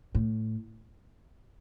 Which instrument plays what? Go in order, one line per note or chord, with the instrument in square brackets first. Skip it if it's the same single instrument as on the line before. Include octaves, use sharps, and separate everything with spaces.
[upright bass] A2